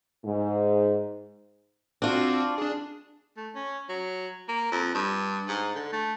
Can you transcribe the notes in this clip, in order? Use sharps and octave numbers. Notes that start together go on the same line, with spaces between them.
G#2
C4 D4 F4 F#4
D4 G#4
A3
C#4
F#3
A#3
F2
G2
G#2
D3
A3